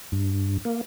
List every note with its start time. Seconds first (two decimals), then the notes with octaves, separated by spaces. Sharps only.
0.12 G2
0.65 A#3